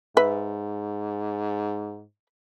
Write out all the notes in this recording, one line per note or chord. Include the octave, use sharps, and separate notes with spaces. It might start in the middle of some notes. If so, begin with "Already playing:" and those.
G#2 B4 E5